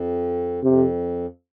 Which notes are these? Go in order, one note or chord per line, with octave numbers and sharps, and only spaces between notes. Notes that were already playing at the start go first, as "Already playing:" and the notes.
Already playing: F2
F2 C3